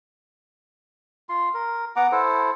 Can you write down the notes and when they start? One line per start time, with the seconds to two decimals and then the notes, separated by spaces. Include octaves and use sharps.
1.29 F4 C6
1.54 A#4
1.96 B3 F#5 A#5 D6
2.12 E4 A4 C5